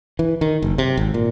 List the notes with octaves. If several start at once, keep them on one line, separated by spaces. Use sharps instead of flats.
E3
D#3
F#1
C3
G#1
A#2